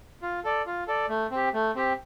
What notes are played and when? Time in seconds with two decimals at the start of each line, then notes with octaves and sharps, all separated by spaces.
0.22 F4
0.44 A4 D5
0.66 F4
0.88 A4 D5
1.09 A3
1.31 C4 G4
1.54 A3
1.75 C4 G4